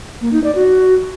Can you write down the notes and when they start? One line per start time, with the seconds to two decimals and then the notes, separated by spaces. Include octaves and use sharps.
0.22 A#3
0.33 D#4
0.44 D5
0.55 F#4